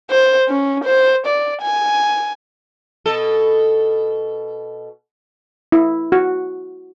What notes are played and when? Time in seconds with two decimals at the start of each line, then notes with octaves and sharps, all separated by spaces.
0.11 C5
0.49 C#4
0.84 C5
1.27 D5
1.62 G#5
3.05 B2 A4
5.72 E4
6.12 F#4